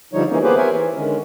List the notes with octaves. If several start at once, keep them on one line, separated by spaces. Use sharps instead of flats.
D3 F3 G3 D#4 C#5
E3 A#3 C4 C#4 D#4
A#3 B3 G4 G#4 B4 C5
B3 A#4 C5 C#5 E5 G#5
E3
D3 D#3 G#3 C#4